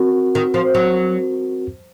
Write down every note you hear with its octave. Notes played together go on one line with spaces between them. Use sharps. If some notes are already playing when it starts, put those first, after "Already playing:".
Already playing: C4 F#4 A#4
D#3
F3
F#3